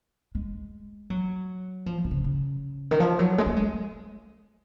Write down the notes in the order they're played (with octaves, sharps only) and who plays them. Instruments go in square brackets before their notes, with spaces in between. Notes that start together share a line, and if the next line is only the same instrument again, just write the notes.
[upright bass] G#3
F#3
F3
D#3
C#3
C#3
D#3
F3
F#3
G#3
A#3
G#3